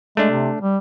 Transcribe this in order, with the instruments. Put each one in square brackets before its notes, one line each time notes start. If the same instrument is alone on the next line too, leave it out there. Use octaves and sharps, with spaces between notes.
[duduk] G#3 [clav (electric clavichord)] A3 D4
[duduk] C3
G3